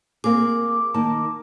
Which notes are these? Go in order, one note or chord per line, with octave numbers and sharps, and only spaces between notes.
A#3 C4 G#4 D6
D#3 A#3 A5